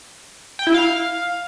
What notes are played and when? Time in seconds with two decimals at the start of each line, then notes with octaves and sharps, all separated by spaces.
0.59 G5
0.67 E4
0.74 F5